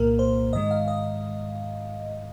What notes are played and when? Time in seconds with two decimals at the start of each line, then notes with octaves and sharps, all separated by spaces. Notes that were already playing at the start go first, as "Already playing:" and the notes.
Already playing: C2 A#2 A#3 A#4
0.19 C5
0.53 G#2 D#3 G#3 D#5
0.71 F5
0.88 D#5